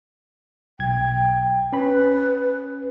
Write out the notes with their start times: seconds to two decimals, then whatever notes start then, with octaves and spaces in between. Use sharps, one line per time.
0.79 B1 G5 G#6
1.73 C#4 B4 B5